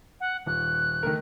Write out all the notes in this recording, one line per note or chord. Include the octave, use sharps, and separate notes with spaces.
F#5
D#1 F#6
D#3 A3 A#4